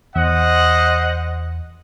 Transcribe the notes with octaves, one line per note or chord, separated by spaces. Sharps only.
E2 C5 D#5 F#5